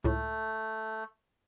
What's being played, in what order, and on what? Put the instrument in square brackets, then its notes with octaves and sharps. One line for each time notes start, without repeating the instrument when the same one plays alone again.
[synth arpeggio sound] C#2 A2 [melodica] A3